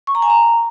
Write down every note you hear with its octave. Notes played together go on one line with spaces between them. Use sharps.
C#6
A#5
G#5
A#5